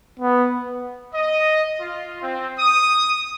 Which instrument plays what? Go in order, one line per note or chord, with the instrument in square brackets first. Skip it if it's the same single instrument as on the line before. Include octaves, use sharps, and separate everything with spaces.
[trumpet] B3
[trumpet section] D#5
F4
C4
D#6